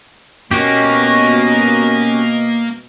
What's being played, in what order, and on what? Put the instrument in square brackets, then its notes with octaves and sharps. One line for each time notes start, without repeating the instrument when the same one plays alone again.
[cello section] B2 D#5 [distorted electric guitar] A#3 [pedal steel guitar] C#4 F#4 G4